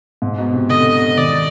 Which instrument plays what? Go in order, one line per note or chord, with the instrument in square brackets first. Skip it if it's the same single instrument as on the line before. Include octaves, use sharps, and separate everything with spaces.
[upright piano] G#2
B2
C3
[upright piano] D3 [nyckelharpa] D#5
[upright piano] D#3 [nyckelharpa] D5